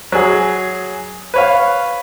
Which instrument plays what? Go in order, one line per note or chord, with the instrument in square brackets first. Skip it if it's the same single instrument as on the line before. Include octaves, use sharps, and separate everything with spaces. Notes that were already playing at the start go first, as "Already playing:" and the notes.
[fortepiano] F#3 G#4
B4 C#5 F5